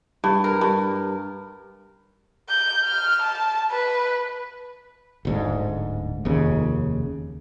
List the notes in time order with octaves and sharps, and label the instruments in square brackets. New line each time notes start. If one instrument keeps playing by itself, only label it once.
[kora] G2
A#4
G2
[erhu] G6
F6
A5
B4
[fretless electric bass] D1 D2 G#2
F1 D#2 C#3